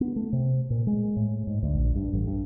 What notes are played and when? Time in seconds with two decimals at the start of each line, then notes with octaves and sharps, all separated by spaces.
0.01 B3
0.16 A3
0.33 C3
0.70 A#2
0.87 G#3
1.16 A2
1.47 G#2
1.63 D2
1.75 A#1
1.95 G2
2.13 A1
2.27 G2